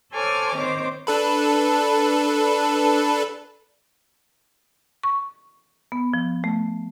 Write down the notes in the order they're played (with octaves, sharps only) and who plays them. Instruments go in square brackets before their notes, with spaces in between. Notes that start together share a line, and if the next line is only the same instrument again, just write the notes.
[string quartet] A4 C5 C#5 G#5 D6 F6
D#3 C4 C5 C#5 D6
[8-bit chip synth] D4 A4 B4
[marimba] C#6
B3
F3
A3